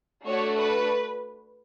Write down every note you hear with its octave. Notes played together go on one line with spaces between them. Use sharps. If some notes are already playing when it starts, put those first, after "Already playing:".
A3 D4 F#4 A4 C#5
B4